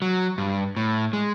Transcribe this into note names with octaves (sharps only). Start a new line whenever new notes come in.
F#3
G2
A2
G#3